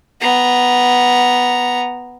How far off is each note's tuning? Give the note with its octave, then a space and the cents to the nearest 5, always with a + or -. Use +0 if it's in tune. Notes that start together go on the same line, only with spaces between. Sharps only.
B3 +0 A#5 +0